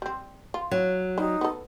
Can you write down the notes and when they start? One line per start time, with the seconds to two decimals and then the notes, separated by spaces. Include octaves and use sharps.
0.02 G3 C4
0.54 F4
0.71 F#3
1.18 G3 D#4
1.41 B3 A4